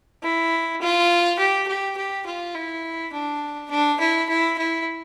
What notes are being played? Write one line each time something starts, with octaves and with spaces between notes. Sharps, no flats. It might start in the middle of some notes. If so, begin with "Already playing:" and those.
E4
F4
G4
G4
G4
F4
E4
D4
D4
E4
E4
E4